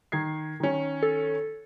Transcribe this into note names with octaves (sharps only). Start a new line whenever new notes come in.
D#3 G#6 C7
D#3 C#4
A4